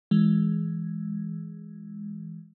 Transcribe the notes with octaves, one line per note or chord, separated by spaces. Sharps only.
E3 G#3